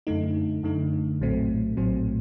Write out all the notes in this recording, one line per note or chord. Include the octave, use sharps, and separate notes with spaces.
F#2 D3 A3 D#4
F#2 D3 A3 D#4
A#1 A2 F#3 A3 C4
A#1 A2 F#3 A3 C4